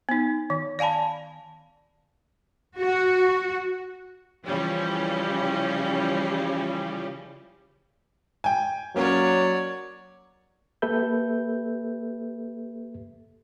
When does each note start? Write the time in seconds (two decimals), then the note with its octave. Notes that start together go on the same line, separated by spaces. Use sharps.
0.09 B3 D#4
0.50 D#3
0.79 D5 F5 G#5 A5 B5
2.77 F#4
4.46 C#3 E3 F3 G3 C#4
8.44 G5 G#5
8.96 F#3 A#3 C#4 C#5 D5
10.82 A#3 G4 A4 B4 E5 G6